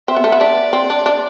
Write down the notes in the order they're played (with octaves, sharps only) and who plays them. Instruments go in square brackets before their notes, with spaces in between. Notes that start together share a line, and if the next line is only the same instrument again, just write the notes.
[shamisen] C4 [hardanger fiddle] E5
[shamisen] B3
A3
B3
[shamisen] D4 [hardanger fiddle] D5
[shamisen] C4
D4
D4